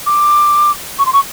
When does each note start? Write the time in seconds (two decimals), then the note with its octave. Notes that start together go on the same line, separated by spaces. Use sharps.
0.06 D6
0.99 C#6
1.06 C6
1.13 C#6